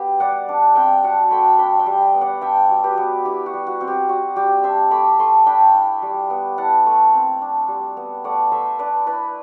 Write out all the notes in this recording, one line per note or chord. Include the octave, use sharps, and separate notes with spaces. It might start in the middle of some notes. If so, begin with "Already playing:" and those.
Already playing: B3 G4
G3 D5 F#5
D4
C4 E5 G5
F#3 F#5 A5
A3 G5 B5
D4 G5 B5
E5 G5
G3
B3
D5 F#5
D4 E5 G5
F#3
G4 B4
B3
E4 G4
F#4
G3
F#4
C4 F#4
G4
G3 F#4
G3 G4
D4 C5 E5
A3 B5 D6
A3 A5 C6
D4 G5 B5
E4
G3
B3
E4 F#5 A5
A3
C4
D4
G3
B3
A3 D5 F#5
A3 C5 E5
D4 B4 D5
E4 B4 D5